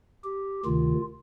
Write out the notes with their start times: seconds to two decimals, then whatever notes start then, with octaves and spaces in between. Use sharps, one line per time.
0.24 G4
0.65 D2 C3 D#3 F4